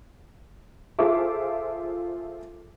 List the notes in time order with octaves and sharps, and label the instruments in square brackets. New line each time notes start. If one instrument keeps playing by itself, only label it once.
[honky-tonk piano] F4 G#4 A4 C5 E5 D6